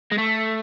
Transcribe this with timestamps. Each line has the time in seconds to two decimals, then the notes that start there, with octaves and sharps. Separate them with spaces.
0.12 G#3
0.18 A3